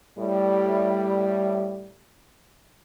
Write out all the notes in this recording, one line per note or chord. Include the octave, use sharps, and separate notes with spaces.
A2 G3